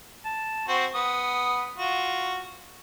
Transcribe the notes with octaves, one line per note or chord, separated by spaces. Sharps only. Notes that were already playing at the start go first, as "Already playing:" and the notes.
A5
C4 F#4 C5
B3 D#6
F4 F#4